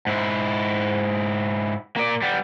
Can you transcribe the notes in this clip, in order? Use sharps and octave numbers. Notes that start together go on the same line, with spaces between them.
G#2 E4
A#3 D5
G3 B3